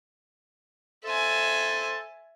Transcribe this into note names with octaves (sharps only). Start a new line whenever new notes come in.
A4 C5 E5 G#5